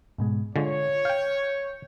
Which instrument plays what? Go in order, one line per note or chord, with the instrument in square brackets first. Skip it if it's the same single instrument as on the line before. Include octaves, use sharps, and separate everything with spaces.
[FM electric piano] G#2 B2 G#3
[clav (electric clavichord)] D3 G#3 [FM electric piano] F4 [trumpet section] C#5
[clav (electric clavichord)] F5 G5 [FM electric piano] G6